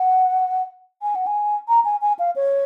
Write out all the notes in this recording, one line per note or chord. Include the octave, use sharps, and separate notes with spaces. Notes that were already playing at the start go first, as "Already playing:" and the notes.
Already playing: F#5
G#5
F#5
G#5
A#5
G#5
G#5
F5
C#5